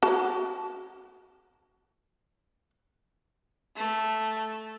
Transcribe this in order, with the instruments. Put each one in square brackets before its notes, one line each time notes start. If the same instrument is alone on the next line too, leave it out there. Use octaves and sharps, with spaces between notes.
[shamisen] F#4 A5
[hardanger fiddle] A3